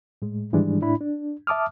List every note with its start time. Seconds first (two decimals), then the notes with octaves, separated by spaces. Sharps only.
0.22 A2 G#3
0.53 G#2 D#3 E3 G3 G#3 D4
0.82 A2 D4 E4 B5
1.01 D4
1.47 E5 A5 D6 D#6 F6